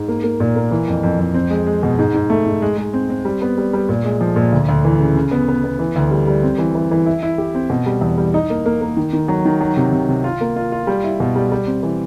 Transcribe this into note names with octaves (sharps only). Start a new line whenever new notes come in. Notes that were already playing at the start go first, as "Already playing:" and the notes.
Already playing: G#2
A#3
A#3
A#2
A#3
E3
F2
F2
F2
C4
G#3
G#3
B2
G#2
G#2
A3
G#2
G#3
G#3
C4
C4
G3
B3
G3
G3
A#2
G#3
F3
A#2
D2
D2
E3
C#3
C#3
B3
B3
B3
E3
D2
G3
G3
C4
E3
E3
E3
E4
E4
G4
C4
B2
G3
E2
G3
D#4
A#3
A#3
A#3
D#3
D#3
F#3
D#3
F#3
C3
C3
C3
F4
A#3
F4
F4
G3
E4
B2
G3
G3
C4
E3